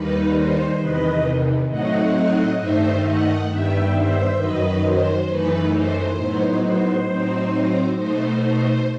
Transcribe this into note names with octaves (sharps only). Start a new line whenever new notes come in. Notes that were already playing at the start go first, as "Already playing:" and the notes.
Already playing: D#2 D#3 G3 D#4 B4
C5
E2 C3 D#3 B4 D#5
A2 F#3 A3 C4 D#4 D#5 F#5
G2 D#3 A3 D#4 C5 E5
D#5 F#5
G2 D#3 G3 B3 E5 G5
C5 E5
F#2 D#3 F#3 B4 D#5
C5
F#2 E3 A3 D#4 B4
C5
A2 F#3 B3 D#4
C5
A2 F#3 C4 D#4
B2 A3 D#4 C5
C5